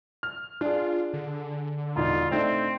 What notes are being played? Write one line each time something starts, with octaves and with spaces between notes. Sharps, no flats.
F6
D4 F4 G#4
D3
E1 D#4 F4
A3 C4 D4 D#4